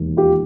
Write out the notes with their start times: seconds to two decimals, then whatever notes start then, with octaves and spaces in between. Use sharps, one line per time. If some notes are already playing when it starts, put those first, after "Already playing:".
Already playing: E1 D#2 D#3
0.17 F4 G4